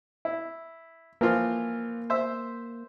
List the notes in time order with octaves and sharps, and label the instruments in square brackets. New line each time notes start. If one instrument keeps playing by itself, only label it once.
[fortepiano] E4
[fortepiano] E3 F3 F4 [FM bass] A#3
[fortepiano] C5 E5